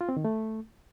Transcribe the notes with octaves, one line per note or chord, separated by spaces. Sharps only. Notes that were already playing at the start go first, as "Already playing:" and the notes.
F4
C4
D#3
A3